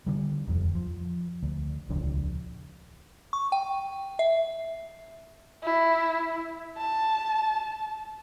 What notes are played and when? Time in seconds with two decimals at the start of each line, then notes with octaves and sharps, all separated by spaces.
0.06 D3 G3
0.47 D#1 F2
0.75 F3
1.43 D2
1.89 D#1 C#2 F3 D4
3.33 C#6
3.52 G5
4.19 E5
5.64 E4
6.78 A5